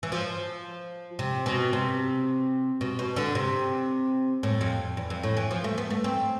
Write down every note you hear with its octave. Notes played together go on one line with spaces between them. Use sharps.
E3
F3
C3
B2
C3
B2
B2
D3
C3
A2
F2
E2
F2
A2
E3
F3
A3
B3
A3
C4